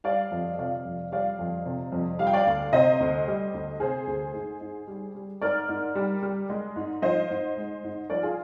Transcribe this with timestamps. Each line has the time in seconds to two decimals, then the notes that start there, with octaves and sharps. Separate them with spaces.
0.04 G3 D5 F5
0.31 F2
0.58 C3 D5 F5
0.85 F2
1.12 G3 D5 F5
1.39 F2
1.66 C3
1.92 F2
2.19 G3 F5
2.27 G5
2.33 D5 F5
2.46 D2
2.73 C3 C5 D#5
3.00 D2
3.27 G3
3.54 D2
3.80 C3 G#4 C5
4.07 D2
4.34 G#2
4.61 G#2
4.87 G3
5.15 G3
5.42 G#2 A#4 D5
5.69 G#2
5.96 G3
6.22 G3
6.49 G#3
6.76 G#2
7.02 F3 C5 D#5
7.30 G#2
7.57 G#3
7.84 G#2
8.10 F3 A#4 D5
8.23 F4 G#4